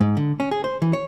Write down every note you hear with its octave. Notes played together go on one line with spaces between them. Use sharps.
G#2
D3
C#4
G#4
C5
E3
C#5